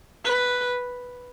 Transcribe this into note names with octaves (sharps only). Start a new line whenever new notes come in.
B4